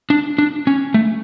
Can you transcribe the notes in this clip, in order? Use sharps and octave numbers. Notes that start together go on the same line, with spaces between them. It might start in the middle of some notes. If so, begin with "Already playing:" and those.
D4
D4
C#4
A3